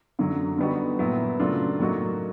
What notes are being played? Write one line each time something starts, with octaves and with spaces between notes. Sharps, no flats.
F#2 D3 F#3
D3 G3 B3 D#4 F#4
A#2 F#3 B3 E4
C#3 F#3 A3 D4 F4
A2 F#3 A#3 D#4 F#4